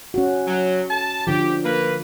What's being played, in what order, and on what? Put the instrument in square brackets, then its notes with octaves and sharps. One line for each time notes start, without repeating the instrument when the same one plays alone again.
[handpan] C#4 F#4
[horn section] F#3
A5
[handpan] D3 F3 [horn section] G4
[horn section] A#3 B4